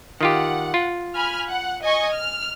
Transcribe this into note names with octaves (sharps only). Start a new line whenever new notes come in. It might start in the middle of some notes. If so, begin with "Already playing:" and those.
D#3 F4 G4 F#5
F4
G#5 B5 F6
F#5
D#5 G#5 C#6
F6